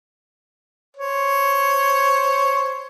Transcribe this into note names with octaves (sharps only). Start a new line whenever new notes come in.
C5 C#5